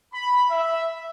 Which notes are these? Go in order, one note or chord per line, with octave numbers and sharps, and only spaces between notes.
B5
E5